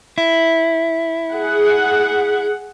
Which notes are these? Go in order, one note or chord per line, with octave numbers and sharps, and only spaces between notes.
E4
G#4 F#5